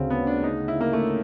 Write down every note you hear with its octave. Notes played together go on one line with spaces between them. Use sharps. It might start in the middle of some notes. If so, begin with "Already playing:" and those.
Already playing: D2 C#3 C4 C#4
B3
D4
D#4
E4
A#3
A3